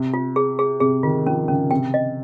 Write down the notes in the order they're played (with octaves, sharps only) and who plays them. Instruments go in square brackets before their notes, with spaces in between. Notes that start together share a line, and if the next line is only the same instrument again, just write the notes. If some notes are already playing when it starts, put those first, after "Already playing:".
Already playing: [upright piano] C3
[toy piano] F4
G#4
G#4
[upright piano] C3 [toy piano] G#4
[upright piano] D#3 [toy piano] F4
[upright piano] F3 [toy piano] C#4
[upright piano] C#3 [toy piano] C#4
[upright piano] C3 [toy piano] G5
[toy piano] D#5